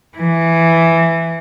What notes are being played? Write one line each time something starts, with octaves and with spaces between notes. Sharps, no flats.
E3